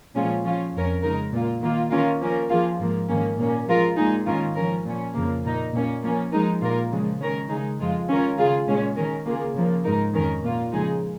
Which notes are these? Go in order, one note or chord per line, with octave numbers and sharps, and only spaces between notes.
A#2 F3 G#3 C#4 F4
F3 C#4 F4
F2 F3 C#4 A#4
C#3 G#3 D#4 A#4
A#2 A#3 F4
D#3 A#3 F4
D#3 A#3 C#4 F4 A#4
F3 A#3 C#4 A#4
F3 A#3 F4 G#4
G#2 F3 A#3
G#2 D#3 A#3 C#4
A#2 A#3 C#4
F3 G#3 F4 A#4
A#2 G#3 D#4 G#4
G#2 D#3 C#4 F4 A#4
F3 C#4 A#4
A#2 F3 C#4
F2 C#3 F3 A#3
A#2 A#3 D#4
A#2 A#3 C#4
F3 A#3 C#4
F3 G#3 D#4 A#4
A#2 A#3 F4 A#4
C#3 F3 G#3
D#3 C#4 A#4
C#3 G#3 D#4 G#4
F2 F3 G#3 F4
D#3 C#4 F4 A#4
C#3 G#3 F4 G#4
A#2 G#3 C#4 G#4
D#3 C#4 A#4
C#3 A#3 F4 G#4
C#3 F3 A#3
G#2 G#3 D#4 A#4
F2 D#3 C#4 A#4
A#2 A#3 F4
C#3 F3 G#3 D#4 G#4